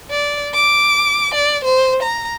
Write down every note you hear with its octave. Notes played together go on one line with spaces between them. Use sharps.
D5
D6
D5
C5
A#5